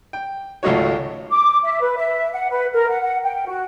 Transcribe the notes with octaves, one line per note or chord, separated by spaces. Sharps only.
G5
G#1 C#2 A3 D#4 F#4 C#5
D6
E5
B4
E5
F#5
B4
A#4
F#5
F#5
G5
F#4